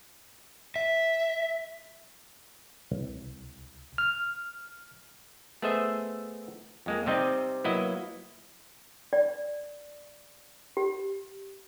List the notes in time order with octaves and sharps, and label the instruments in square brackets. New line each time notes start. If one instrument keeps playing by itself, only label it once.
[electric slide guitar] E5
[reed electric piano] C2
F6
[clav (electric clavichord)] A3 B3 G#4 C5 D#5 E5
F2 G#3 A#3
C3 G3 C4 D#4 D#5
F#3 A#3 B3 E4 D#5
[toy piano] D5
G4